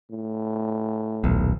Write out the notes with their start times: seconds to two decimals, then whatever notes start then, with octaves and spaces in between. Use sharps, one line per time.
0.11 A2
1.24 D#1 B1